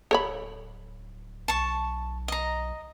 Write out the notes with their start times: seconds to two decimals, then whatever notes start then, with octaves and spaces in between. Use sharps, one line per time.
0.11 D1 A4 C#5 B5
1.48 B1 A5 C#6
2.28 D#5 A#5